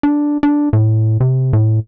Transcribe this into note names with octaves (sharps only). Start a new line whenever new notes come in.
D4
D4
A2
C3
A2